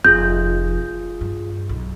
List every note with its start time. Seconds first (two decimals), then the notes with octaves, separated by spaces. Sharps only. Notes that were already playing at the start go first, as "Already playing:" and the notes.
0.05 F1 F4 G#4 G6
1.21 G2
1.69 B1